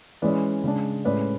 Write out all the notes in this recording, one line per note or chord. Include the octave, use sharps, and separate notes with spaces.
E3 G#3 C#4 B4 D5
C#3 G#3 D4
A2 G#3 C#4 B4 D5